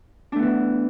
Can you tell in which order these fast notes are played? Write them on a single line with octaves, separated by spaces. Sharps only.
D4 A3 B3 E3